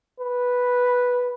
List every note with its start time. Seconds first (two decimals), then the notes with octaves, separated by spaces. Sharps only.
0.20 B4